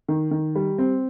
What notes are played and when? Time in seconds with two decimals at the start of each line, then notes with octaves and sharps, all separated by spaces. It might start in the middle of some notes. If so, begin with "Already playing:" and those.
0.08 D#3
0.31 D#3
0.55 G3
0.78 C4